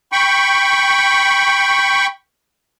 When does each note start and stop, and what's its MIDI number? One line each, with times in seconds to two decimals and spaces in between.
0.12 2.07 79
0.12 2.07 83
0.12 2.07 85